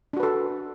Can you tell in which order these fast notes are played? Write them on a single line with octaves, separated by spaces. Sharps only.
D4 F#4 B4 A4